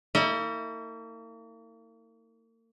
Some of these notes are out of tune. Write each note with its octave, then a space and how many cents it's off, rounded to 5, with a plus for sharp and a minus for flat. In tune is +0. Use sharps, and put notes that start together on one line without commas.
A#3 -40 E4 -40